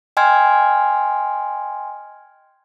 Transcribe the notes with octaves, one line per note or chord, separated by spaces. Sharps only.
D#5 G5 G#5 C6 F6 G#6